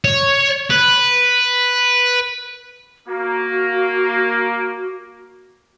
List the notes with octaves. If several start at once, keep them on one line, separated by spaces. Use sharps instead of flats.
C#5
B4
A#3 F#4